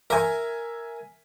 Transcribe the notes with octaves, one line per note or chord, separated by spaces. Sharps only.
A#4 E5 G#5